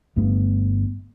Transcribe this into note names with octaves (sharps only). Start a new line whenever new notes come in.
G1 G2 A3 B3